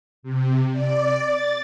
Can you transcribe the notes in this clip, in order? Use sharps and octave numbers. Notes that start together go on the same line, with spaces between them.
C3
D5
A6